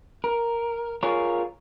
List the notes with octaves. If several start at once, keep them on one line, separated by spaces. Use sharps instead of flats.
A#4
F4 G#4 A#4 C#5